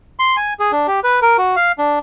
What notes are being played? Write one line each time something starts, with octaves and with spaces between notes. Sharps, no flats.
C6
G#5
G#4
D4
G4
B4
A#4
F#4
F5
D4